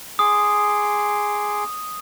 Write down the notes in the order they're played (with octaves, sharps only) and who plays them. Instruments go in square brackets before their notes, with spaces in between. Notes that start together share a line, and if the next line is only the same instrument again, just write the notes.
[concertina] G#4 C6 D6 [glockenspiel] D#6